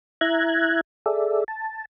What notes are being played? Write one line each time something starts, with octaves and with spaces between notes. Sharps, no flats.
E4 E5 A#5 F#6 G#6
G#4 A4 D5 E5
A5